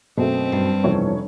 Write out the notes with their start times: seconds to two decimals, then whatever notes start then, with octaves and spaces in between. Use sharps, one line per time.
0.17 F#2 B2 A3 C4
0.52 G2
0.84 F1 B2 E3 F3 C#5